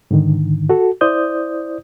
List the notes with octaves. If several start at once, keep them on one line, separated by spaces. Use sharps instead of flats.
G#2 D3 D#3
F#4 A4
E4 C5 D5 D#6 G6